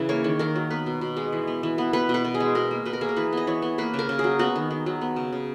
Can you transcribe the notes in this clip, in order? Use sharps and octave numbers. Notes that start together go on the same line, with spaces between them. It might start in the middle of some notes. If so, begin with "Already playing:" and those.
Already playing: C#3 E3
A#3 C#5
D#3
D#3 A#4
F#3
B3 B4
B2
B2
G#3
E3
B3
E3
B3
B3 B4
B2
B4
B2
G#4
G#3
B2 A#4
A#3
B2 B4
A#4
A#3 G#4
A#4
E3 B4
B3 D#5
E3 C#5
B3
A#3 B4
C#3
A#4
C#3
G#4
F#3
B3 F#4
D#3
D#3
F#3
B3
C#3
C#3